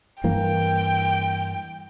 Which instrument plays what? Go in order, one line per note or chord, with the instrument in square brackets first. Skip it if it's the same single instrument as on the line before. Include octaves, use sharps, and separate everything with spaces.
[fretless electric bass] G2 E3 A#3 [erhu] G5